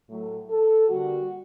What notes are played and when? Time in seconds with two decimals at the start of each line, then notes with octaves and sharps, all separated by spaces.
0.09 A2 F#3 A3
0.49 A4
0.88 D3 G3 A#3 F#4